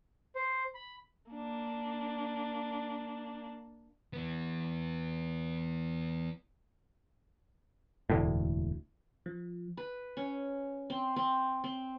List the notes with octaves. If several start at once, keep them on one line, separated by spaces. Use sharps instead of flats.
C5
B5
A#3 D4
E3 B3
E1 D2 A2
F3
B4
C#4
C4
C4
C4